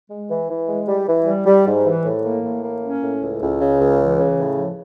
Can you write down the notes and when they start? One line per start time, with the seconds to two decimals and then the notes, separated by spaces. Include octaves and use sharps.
0.09 G#3
0.29 E3
0.49 E3
0.68 G#3
0.87 G3
1.07 E3
1.26 G3
1.46 G3
1.66 G#2
1.84 E3
2.05 A2
2.24 A#3
2.43 A2
2.63 A#3
2.82 C#4
3.02 A2
3.22 C#2
3.41 C#2
3.60 C#3
3.80 C#2
4.00 E3
4.19 C#3
4.38 A2
4.57 F3